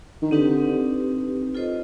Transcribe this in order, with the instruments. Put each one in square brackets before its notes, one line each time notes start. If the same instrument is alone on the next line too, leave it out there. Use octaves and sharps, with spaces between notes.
[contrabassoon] D#3
[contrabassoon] D3 [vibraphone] C4 D#4 G4 B4
[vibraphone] F4 A4 C5 D#5